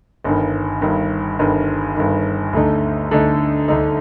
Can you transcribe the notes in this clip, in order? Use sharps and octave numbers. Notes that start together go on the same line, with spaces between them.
G1 G2 D#3
G1 G2 D#3
G1 G2 D#3
G1 G2 D#3
D2 D3 A3 D#4
D2 D3 A3 D#4
D2 D3 A3 D#4